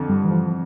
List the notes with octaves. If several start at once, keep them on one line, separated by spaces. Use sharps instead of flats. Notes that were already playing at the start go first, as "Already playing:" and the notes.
Already playing: F2 D3
G2 G3
E3
F3